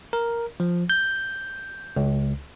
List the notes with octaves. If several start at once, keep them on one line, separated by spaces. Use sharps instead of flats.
A#4
F3
G6
C#2